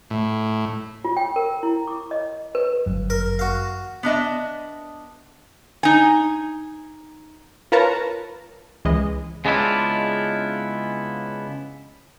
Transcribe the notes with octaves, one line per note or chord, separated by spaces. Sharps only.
A2
F4
G5
A#4
E4
D6
D#5
B4
G1 F#2
A#4
F#4 F5
B3 D4 D#5 E5
D#4 G#5
F4 A#4 B4 C#5 A5 A#5
C#2 E3 G#3 D#5
C#3 G#3 B3 D4 E4 F4